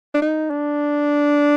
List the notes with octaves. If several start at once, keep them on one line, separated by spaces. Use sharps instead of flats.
D4
D#4
D4